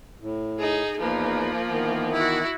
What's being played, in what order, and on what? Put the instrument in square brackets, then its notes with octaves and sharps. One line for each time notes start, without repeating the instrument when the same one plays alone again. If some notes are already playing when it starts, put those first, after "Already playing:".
[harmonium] A2
[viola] D#4 G#4
[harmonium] E2 D#4 B4 [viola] F3 A#3
[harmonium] D#3 E3 B3
[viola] E4 F#4